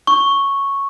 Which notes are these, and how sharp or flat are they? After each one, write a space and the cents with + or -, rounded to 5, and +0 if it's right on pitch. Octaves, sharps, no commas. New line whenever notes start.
C#6 -5